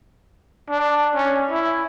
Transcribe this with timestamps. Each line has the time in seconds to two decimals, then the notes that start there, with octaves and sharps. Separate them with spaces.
0.70 D4
1.15 C#4
1.51 E4